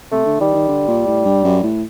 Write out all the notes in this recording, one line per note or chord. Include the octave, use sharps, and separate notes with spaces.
C3 A3
D3
D#3 G3
D#3
D3
A#2
A2
G2
F#2
A2